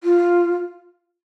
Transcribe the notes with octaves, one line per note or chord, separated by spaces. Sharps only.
F4